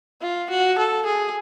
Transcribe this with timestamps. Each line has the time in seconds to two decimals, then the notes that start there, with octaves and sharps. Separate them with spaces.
0.21 F4
0.50 F#4
0.78 A4
1.06 G#4